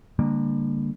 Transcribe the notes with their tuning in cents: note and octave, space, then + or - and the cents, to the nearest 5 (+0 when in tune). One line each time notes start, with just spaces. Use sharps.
D3 +0 G3 +40 A#3 +0